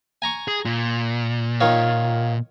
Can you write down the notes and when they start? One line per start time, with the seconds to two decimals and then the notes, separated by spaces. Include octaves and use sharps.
0.22 G#5 A#5 C#6
0.48 G#4
0.65 A#2
1.61 D#3 F4 C#5